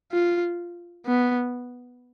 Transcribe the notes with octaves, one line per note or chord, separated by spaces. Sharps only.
F4
B3